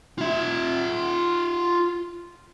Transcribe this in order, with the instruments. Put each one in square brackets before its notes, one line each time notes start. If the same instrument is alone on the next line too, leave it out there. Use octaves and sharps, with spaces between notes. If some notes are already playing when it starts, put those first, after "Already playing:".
[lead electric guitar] F4 E5